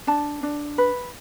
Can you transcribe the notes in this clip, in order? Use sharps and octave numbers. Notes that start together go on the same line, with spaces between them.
D4 A5
D4
B4